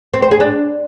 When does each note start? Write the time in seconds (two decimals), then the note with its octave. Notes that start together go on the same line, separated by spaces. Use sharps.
0.14 C4
0.22 C5
0.31 G#4
0.40 D4